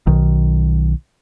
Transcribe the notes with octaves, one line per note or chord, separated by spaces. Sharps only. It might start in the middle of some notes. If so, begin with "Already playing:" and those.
B1 D#3